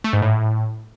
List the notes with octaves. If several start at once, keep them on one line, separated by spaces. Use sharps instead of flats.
A3
G#2
A2